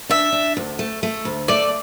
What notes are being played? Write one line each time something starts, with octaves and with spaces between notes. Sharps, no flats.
D4 E5
D4
D2
A3
A3
D2
A3 D5